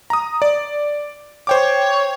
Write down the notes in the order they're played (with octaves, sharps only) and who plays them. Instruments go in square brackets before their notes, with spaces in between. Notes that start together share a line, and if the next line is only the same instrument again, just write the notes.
[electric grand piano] A#5 D#6
D5
[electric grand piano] C5 G5 D6 [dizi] C#5